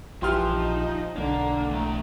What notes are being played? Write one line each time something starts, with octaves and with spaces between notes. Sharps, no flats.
A#1 E3 F3 G4 C6 F6
D#4
B1 D3 A#3
E3 A3 A#5